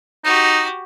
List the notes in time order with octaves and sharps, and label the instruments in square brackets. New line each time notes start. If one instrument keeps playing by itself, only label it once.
[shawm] D#4 [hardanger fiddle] F#4 G4